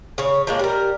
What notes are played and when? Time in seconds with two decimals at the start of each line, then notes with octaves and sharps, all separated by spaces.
0.18 C#3 C#5
0.47 F3 G#3 A#3
0.59 G3 A#4